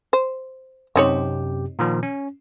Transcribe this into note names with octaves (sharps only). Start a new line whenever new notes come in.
C5
F#2 C3 C4 D#4 G4 C#5
A#2 D#3 F3
C#4